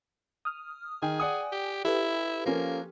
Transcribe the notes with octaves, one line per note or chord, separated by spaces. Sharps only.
D#6 F6
D#3 G#4 G5 G#5
D5 F#5 D#6
G4
E4 G4 A4 B4
F3 A#3 C#4 A#4